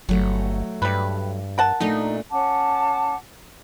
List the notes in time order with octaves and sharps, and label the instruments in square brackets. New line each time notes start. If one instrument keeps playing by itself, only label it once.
[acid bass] G1 [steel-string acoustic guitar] F#3 A3
[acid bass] G2 [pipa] G3 B4
[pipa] A#4 F#5 A5
[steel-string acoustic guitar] A#2 A3 D4 [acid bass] D#4
[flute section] C#4 F#5 A5 D6